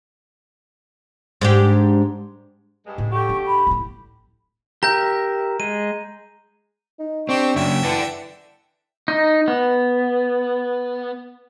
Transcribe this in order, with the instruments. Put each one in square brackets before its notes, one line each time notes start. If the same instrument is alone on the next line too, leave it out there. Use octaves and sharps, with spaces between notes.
[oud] G#2 D4 G4
[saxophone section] G2 G#3
[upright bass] A2
[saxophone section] D3 G4 [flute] C#6
[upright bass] D4
[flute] B5
[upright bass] A1 E4
[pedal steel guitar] G4 A#4 E5 [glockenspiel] A#5 G6
[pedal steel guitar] G#3 [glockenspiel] D#7
[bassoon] D#4
[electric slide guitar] C4 [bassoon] D4 [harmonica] G4 C#6
[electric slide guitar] F#2 C#3 [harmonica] E5 G5
[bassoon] E3 [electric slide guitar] D5 F#5 A5
[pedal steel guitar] D#4
B3